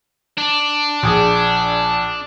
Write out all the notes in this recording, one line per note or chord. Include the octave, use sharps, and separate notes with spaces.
D4
A#1 G#4 D#6